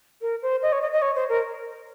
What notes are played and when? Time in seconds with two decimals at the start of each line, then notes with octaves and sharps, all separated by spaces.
0.22 A#4
0.42 C5
0.62 D#5
0.72 C#5
0.82 D#5
0.92 D#5
1.02 C#5
1.15 C5
1.29 A#4